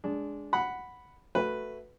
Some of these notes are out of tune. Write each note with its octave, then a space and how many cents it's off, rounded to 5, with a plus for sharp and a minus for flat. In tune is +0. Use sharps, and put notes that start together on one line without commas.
G#3 +0 D4 -15
F#5 +0 B5 +0
A3 +0 F#4 +0 B4 +0